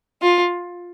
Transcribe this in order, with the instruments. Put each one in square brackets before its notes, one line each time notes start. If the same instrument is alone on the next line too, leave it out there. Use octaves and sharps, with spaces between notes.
[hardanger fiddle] F4